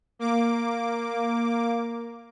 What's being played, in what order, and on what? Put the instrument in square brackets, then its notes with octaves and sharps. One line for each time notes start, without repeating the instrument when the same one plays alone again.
[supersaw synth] A#3 D6